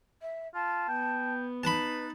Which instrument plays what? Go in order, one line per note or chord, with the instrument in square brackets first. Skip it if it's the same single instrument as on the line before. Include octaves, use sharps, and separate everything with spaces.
[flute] E5
[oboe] F4 [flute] A5
[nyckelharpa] B3 [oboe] G5
[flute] D#4 [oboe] B4 [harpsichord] A5 B5